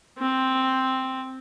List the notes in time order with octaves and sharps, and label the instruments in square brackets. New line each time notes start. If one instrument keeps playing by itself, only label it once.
[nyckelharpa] C4